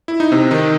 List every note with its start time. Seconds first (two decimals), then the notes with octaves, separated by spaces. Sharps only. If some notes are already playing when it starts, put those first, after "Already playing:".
0.08 E4
0.20 D#4
0.32 C3 C4
0.51 D#3 D#4